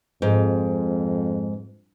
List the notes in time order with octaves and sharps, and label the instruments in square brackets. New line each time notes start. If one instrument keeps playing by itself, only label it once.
[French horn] F2 [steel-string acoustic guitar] G#2